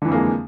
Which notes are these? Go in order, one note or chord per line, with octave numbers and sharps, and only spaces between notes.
F2 D3 E3 G#3 A#3